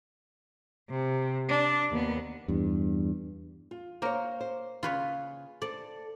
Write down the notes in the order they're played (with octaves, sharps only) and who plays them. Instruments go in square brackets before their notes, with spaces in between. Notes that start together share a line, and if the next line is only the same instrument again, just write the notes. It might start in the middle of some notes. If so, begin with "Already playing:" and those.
[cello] C3
D4
D#2 B3
[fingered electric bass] E2 G2
[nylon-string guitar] F4
[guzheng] A#3 A#4 [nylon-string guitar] C5 C#5
[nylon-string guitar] C5
[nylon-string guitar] C#3 [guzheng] F4 B4 C#5
[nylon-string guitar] A4 C5 [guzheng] D5